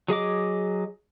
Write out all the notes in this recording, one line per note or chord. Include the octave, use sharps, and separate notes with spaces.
F#3 G#4 D#5 D6